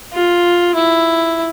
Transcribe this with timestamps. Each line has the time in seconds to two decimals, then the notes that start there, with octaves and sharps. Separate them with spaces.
0.13 F4
0.75 E4